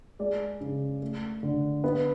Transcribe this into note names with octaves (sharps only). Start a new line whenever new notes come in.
G#3 D5
C#3
A3
D3
B3 B4